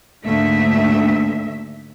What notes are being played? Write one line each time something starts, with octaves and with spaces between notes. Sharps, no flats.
D2 G#2 A3 A#3 E5